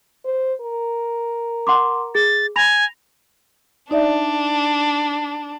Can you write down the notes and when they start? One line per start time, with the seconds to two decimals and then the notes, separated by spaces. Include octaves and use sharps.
0.25 C5
0.61 A#4
1.67 F#5 C6 D6
2.15 G#4 A6
2.56 G#5 B5 A#6 F7
3.91 D4 D#4 D5 E5